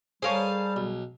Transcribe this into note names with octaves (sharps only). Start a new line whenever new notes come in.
G3 G#4 A#4 C5 C#5 F5 A5
B1